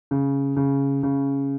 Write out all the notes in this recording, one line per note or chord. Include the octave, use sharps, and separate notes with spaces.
C#3
C#3
C#3